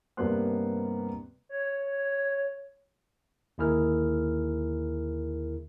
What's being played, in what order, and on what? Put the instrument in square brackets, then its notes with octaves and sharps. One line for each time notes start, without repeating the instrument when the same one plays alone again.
[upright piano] G2 C3 A#3 B3 C6 F#6
[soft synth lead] C#5
[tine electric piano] D#2 D3 E4 G#4 A#4 F6